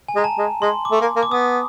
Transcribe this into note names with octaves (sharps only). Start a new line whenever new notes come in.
G#5
G#3
A#5
A5
G#3
G#3 C6
D6
A3
A#3
A#3
D6
B3 D#6